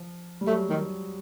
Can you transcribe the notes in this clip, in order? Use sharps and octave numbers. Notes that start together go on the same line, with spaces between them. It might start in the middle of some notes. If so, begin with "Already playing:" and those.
Already playing: F3
G3
F#3 A3
D#3 G3